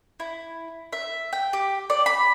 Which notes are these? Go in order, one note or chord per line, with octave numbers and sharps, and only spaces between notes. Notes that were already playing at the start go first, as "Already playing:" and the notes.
E4
E5
G5
G4
D5
B5